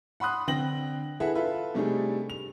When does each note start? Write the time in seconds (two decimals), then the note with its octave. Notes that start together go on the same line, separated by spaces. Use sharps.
0.20 F#5 B5 C6 D#6 F#6
0.47 D3 C4 G5 A#6 F#7
1.20 E4 G#4 A4 B4 E5 F#5
1.35 F4 A4 B4 E5
1.74 C3 G3 A3 D4 D#4 G#4
2.30 F7